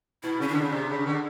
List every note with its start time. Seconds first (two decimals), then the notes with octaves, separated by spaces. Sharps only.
0.23 B2 E4
0.40 C#3 C#4
0.48 D3 D4
0.62 C#3
0.72 C3
0.90 C#3
1.06 D3